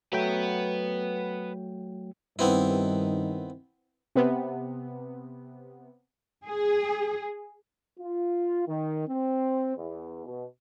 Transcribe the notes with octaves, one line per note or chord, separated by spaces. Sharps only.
F#3 A3 B4 F#5 G5
G2 D#3 B3 C4 E4
C3 B3
G#4
F4
D#3
C4
E2
B2